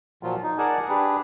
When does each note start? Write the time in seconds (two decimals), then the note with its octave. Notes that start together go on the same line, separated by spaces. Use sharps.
0.23 A#2 F3 F#3 F4
0.43 D#4
0.58 G#4 A#4 D5 F#5 G#5 A5
0.89 D4 G4 G#4 B4